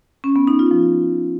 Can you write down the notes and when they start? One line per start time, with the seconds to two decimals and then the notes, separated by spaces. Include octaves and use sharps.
0.24 C#4
0.36 B3
0.47 D#4
0.59 F4
0.71 F3